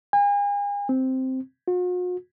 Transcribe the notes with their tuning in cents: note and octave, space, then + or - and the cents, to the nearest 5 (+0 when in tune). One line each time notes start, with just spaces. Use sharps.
G#5 -40
C4 -5
F#4 -45